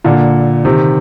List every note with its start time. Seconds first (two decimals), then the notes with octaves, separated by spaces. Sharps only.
0.04 A#2 D3
0.65 C3 D#3